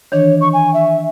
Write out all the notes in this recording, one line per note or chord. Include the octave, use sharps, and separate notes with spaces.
D#3 E3 D4 C#5
C#6
G#5
E5